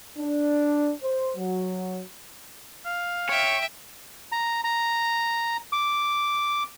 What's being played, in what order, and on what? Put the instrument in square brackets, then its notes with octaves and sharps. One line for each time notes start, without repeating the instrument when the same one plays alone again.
[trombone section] D4
C5
F#3
[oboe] F5
[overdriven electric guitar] C#5 [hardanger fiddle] E5 G5
[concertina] A#5
A#5
D6